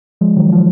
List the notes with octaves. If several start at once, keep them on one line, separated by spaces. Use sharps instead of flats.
F3 G#3
D#3 F#3
F3